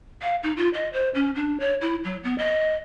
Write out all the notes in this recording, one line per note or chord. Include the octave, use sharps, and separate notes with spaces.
F5
D#4
F4
D#5
C5
C#4
D4
C#5
E4
F#3
B3
D#5